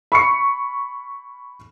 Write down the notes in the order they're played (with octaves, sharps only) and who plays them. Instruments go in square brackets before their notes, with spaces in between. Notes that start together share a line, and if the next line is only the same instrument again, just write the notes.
[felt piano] B5 C#6 C#7